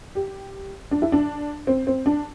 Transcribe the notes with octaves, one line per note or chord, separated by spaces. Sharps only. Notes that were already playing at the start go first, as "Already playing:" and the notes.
G4
D4
E4
D4
C4
C4
D4